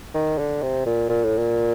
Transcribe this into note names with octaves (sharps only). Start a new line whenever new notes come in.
D#3
D3
C3
A#2
A#2
A2
A#2